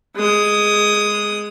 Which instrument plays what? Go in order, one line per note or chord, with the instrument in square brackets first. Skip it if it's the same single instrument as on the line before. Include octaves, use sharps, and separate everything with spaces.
[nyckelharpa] G#3 D#6